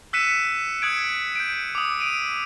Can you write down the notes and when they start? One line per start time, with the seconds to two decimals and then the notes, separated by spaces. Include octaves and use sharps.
0.13 E6 F#6 B6 C#7 D#7 E7
0.82 D#6 F#6 G#6 D7
1.35 G6 D7
1.75 D6 D#6
2.00 D#6 D7 D#7